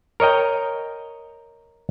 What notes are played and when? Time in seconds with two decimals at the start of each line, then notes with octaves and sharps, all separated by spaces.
0.20 A#4 C#5 D#5 G5